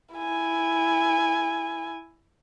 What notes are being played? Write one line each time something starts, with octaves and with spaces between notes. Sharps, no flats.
E4 G#5